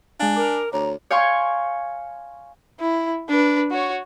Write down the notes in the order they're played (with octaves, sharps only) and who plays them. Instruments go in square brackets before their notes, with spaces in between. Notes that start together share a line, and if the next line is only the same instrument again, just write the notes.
[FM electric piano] G#3 F5 [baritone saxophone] D4 [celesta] G#5
[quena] A#4 [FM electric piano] D6
[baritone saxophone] D2 [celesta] C#5 [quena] A#5
[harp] C#5 F5 G5 G#5 C6 C#6
[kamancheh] E4
D4 B4
F#4 C#5